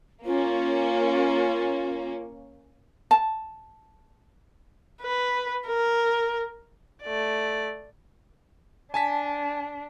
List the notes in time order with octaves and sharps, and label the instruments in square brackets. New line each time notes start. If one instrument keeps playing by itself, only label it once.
[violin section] A#3 C#4 [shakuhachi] F4
[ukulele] A5
[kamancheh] B4
A#4
A3 D5
[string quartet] D4 [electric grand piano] G#5 A5 B6